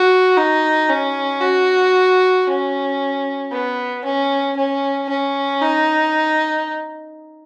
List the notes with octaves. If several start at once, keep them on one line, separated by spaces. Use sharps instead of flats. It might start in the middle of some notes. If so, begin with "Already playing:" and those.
Already playing: F#4
D#4
C#4
F#4
C#4
B3
C#4
C#4
C#4
D#4